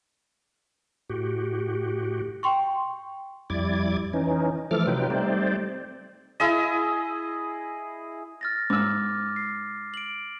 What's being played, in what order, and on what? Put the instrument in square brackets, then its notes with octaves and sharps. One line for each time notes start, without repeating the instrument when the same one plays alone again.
[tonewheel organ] A2 F#4 G4
[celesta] G5 C6 C#6
[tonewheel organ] F2 G3 E4 D5 D6 G#6
E3 C#4 D#4
E3 F3 A3 A4 D6 F6
C3 F#3 D#4 F4 B4 G5
G3 A3 C4 D#4 C5 D5
[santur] E4 G#4 D#5
[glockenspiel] F6 A6 A#6
[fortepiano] G#2 E6 [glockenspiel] D6 F6
[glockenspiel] C7
D7 F#7